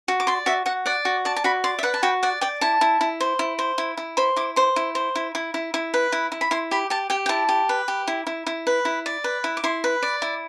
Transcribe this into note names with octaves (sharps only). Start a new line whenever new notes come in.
F#4
D6
D5 C6
F#4 E5
F#4 F#5
D5 F#5
F#4
D5 A5
A5
F#4 B5
D5 C6
E5
B4 F#5
A5
F#4 G5
D5 F#5
D5 G5
E4 A5
E4
E4
C5
E4
C5
E4
E4
C5 B5
E4 D6
C5 C6
E4
C5
E4
E4
E4
E4
B4
E4
E4
B5
E4 C6
G4 B5
G4 A5
G4 G5
G5
E4 A5
G4
B4
G4
E4
E4
E4
B4
E4
D5
B4
E4
D6
E4 C6
B4
D5
E4